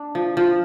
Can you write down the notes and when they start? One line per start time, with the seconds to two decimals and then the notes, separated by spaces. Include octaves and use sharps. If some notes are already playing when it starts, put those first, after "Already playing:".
Already playing: D4
0.15 F3
0.37 F3